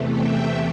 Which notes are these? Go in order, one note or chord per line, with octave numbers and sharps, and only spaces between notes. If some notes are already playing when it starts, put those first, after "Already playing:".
Already playing: E2 C3 E3 A3
E5 G5